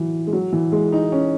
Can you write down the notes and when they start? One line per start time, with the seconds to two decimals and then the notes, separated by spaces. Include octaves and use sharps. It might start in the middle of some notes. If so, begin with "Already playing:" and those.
Already playing: E3 F#3
0.27 G#3
0.33 F#3
0.53 E3
0.72 G#3
0.92 D#4
1.12 C#4